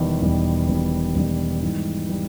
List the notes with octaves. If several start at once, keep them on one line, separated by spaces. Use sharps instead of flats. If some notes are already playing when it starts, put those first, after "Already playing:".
Already playing: E1 E2 D#3 G3
E1 E2 D#3 G3
E1 E2 D#3 G3
E1 E2 D#3 G3
G#2 E3 G3
E3 G3